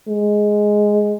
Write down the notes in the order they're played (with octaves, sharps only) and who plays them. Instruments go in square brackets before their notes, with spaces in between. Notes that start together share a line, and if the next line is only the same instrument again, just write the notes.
[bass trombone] G#3